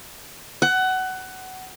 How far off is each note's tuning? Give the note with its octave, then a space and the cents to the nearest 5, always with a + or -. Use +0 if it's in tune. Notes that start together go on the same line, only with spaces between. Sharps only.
F#5 +20